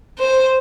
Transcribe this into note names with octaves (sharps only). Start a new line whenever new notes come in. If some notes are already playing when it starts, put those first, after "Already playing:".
C5